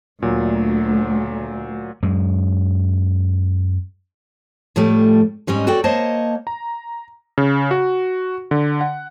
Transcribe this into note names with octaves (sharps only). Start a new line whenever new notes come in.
D2 A#2 F#3
F#2 G#3
A2 F3 G3 A3
G#2 G3 C#4 D#5
F#4 A4 D5 G5
A#3 C5 C#5 D#5 A5
A#5
C#3
F#4
D3
F#5